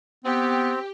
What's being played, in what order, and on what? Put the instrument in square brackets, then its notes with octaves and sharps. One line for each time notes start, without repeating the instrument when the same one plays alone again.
[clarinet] B3 [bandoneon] C4 [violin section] G4